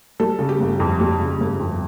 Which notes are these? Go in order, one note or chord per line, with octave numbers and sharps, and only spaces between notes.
G3 A4
C#3
G4
G1
F2
G3
C#3
G1
F2